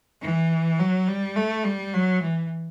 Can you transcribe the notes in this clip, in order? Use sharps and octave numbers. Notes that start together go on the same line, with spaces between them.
E3
F#3
G3
A3
G3
F#3
E3